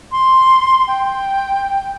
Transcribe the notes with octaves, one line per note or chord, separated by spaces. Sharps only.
C6
G5